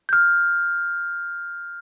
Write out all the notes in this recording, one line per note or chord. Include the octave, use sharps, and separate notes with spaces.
F6 G6